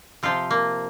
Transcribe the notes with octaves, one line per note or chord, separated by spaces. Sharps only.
C3 F3 F4
A#3